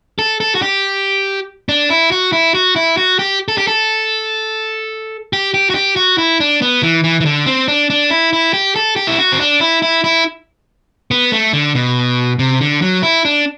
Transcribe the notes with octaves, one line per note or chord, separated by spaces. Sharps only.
A4
A4
F#4
G4
D4
E4
F#4
E4
F#4
E4
F#4
G4
A4
G4
A4
G4
G4
F#4
G4
F#4
E4
D4
B3
E3
E3
E3
D3
C4
D4
D4
E4
E4
G4
A4
G4
E4
F#4
C4
D4
E4
E4
E4
B3
A3
D3
B2
C3
D3
F#3
E4
D4